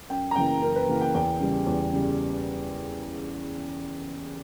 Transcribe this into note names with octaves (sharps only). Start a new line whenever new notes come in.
F#2 G5
A#5
C#3 E3 A#3 G5
F#2 A#4
B4
C#3 E3 A#3
G5
E2 G5
C#3 G3
E2
C#3 G3